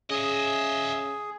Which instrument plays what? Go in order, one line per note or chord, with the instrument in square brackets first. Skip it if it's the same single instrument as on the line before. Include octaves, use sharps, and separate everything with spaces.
[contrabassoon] C#3 [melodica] G#4 [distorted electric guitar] D#5 E5